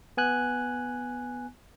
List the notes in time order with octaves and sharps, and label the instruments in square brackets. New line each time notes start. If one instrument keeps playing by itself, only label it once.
[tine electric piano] B3 G#5 F#6